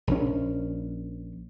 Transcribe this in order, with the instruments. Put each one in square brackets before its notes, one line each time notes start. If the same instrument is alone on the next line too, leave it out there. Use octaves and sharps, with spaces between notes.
[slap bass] A#1 C#4